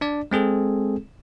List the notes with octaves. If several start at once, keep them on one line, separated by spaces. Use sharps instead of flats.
D4 D5
G#3 C4 G#4 A4